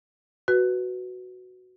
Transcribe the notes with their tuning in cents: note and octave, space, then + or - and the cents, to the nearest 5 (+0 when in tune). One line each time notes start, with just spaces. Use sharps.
F#4 +0 B4 +0